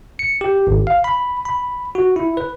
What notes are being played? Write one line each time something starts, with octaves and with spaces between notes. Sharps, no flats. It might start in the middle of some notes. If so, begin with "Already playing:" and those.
C#7
G4
G#1
F5
B5
B5
F#4
E4
B4